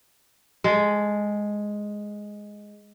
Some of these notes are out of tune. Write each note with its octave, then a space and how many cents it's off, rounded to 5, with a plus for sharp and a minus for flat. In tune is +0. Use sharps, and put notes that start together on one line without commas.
G#3 +0 A4 -20